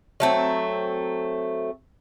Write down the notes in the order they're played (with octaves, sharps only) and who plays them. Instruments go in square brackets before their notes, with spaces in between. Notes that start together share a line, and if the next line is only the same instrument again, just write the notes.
[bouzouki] F#3 A3 C4